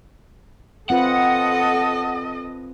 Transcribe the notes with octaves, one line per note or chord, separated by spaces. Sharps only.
C4 F4 A4 B4 D#5 F#5